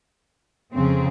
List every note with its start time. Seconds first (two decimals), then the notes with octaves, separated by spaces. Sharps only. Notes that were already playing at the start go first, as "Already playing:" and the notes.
0.74 F2 C#3 F3 C4